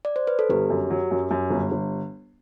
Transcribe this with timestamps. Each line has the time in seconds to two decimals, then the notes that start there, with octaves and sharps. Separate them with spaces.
0.05 D5
0.16 C5
0.27 B4
0.39 A4
0.49 G1 G4
0.70 F#2
0.90 F#3
1.11 F#2
1.31 F#2
1.50 G1
1.71 G1